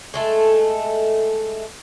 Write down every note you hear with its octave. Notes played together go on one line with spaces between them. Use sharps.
G#3 A3 A4